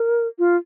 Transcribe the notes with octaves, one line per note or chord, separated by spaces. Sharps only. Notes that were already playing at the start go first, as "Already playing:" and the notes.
Already playing: A#4
F4